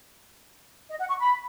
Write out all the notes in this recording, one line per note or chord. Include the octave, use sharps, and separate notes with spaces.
D#5
F#5
C#6
B5